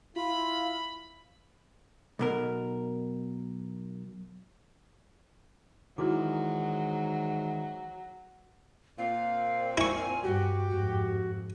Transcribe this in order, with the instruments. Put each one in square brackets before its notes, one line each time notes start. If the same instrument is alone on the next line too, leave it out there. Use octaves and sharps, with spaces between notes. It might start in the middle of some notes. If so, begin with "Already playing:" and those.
[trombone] E4 [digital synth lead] F4 [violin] B5
[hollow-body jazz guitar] B1 B2 A#4
[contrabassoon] G#2 [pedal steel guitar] D#3 E3 F6 [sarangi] F#3 [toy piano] E4 F#4 D6
[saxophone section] A#2 C4 [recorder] F5
[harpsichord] E4 C#6 [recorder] G#5
[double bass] G2 [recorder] F#4 [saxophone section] G4
[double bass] F2 G#2 [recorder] F#4